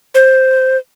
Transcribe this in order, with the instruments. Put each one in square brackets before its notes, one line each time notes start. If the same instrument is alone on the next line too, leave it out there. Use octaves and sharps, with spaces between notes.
[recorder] C5